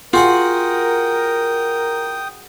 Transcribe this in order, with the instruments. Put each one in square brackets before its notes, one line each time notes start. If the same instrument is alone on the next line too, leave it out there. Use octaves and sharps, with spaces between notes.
[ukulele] F4 [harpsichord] F#4 G#4 F#5 [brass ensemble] A#4 [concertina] G5 D#6